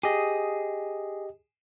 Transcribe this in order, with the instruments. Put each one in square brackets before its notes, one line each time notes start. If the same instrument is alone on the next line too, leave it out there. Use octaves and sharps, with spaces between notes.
[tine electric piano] G4 D#5 [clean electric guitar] G#4